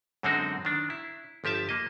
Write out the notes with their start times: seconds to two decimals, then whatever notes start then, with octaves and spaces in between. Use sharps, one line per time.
0.23 F#2 D3 G#3 C4 D#4 F#4
0.65 D#3 D4
0.90 E4
1.44 G1 F3 G4 E5 A5
1.69 A#3 D#5